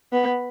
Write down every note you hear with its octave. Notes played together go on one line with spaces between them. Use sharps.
B3